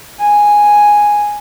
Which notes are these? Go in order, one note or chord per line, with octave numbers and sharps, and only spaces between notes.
G#5